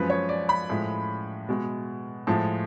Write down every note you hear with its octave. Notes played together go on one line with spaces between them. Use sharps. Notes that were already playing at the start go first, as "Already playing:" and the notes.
Already playing: F#2 F3 G#3 B4
C#5
D5
B5
A2 F3 G#3
B2 G#3
A2 F3 G#3 A5